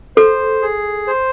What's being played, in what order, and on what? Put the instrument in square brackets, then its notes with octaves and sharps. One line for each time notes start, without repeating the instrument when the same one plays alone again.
[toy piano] A4 [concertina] C5
[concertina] G#4
C5